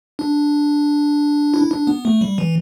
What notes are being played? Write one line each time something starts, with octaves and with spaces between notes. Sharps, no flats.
D4
E4
D4
B3
A3
G3
E3